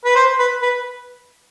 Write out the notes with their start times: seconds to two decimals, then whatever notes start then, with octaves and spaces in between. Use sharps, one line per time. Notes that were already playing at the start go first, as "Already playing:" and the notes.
0.05 B4
0.16 C5
0.39 B4
0.62 B4